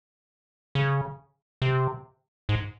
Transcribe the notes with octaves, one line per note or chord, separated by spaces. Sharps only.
C#3
C3
G#2